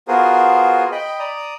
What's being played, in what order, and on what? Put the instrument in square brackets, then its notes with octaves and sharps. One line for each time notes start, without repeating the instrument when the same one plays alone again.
[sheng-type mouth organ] B3 F4 F#4 G#4 A#4 C5
D#5 G5 B5
D5 A#5 D#6